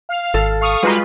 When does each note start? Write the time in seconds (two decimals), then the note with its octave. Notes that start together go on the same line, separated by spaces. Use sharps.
0.09 F5
0.34 G#1 A4
0.61 F5 C#6 D#6
0.83 G3 G#3 F4 F#4 B4 A#5